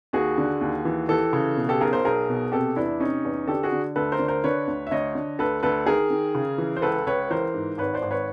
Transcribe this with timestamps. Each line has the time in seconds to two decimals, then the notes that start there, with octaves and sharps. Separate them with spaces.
0.13 D#2 F#4 G#4
0.38 D3
0.61 D#2
0.85 E3
1.09 E3 G4 A4
1.33 C#3
1.57 B2
1.69 G4 A4
1.81 B1 G#4 A#4
1.93 A#4 C5
2.04 B1 G#4 A#4
2.29 B2
2.52 C3 G4 A4
2.76 E2 D4 E4
3.00 C3 C#4 D#4
3.25 E2
3.48 D3 G4 A4
3.63 F#4 G#4
3.72 D3
3.96 D2 A4 B4
4.12 A#4 C5
4.19 D3
4.28 A#4 C5
4.44 D3 B4 C#5
4.67 D2
4.87 E5
4.91 D2 C#5 D#5
5.15 D3
5.39 D2 A4 B4
5.63 D2 A4 B4
5.86 D#3 G#4 A#4
6.10 D#3
6.35 C#3
6.58 E3
6.77 C5
6.82 C#2 A4 B4
7.06 C#2 B4 C#5
7.30 E3 A#4 C5
7.54 G#2
7.78 G#1 B4 C#5
7.94 C5 D5
8.02 G#1
8.11 B4 C#5